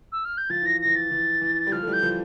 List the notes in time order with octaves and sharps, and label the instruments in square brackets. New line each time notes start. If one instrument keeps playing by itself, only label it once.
[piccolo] E6
F6
G6
[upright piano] F3 [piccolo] A6
[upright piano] E3 [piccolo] A#6
[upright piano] E3 [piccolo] A#6
[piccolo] A6
[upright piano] E3
E3
G3
[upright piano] F3 [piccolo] F6
[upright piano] A3
E3 G3
[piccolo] G6
[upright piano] F3